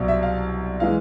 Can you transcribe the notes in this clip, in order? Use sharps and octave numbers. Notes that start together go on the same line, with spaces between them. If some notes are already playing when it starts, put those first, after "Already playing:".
Already playing: C2 B2 F#3
E5
F5
E3 G#3 F5